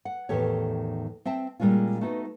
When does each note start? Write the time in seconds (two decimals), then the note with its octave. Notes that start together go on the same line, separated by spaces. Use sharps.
0.05 F#5
0.29 E2 A2 D#3 G4 A4 C#5
1.25 C4 E5 G5 A5
1.60 A#2 G3 G#3 C#4 F4
2.01 A3 B3 D#4 F#4